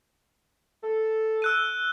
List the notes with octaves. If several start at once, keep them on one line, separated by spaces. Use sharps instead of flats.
A4
E6 F#6 D#7